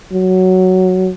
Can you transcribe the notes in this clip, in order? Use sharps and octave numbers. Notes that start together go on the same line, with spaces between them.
F#3